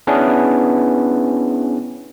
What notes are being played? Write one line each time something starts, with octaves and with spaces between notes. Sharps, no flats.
B3 C#4 D4 E4 G#4 B4